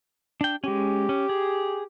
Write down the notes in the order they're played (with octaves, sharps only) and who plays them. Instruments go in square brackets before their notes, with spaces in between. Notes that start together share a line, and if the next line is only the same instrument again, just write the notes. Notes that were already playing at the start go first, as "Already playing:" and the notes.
[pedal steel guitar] D4 G5
[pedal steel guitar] G#3 C#4 [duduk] G4
[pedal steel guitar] C#4
G#4